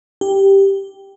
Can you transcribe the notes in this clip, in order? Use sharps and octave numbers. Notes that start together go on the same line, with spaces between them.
G4